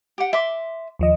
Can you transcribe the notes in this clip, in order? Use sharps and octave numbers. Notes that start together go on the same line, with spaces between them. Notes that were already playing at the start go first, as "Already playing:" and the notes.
G4 F#5
E5 C6 D6
D#2 F3 D#5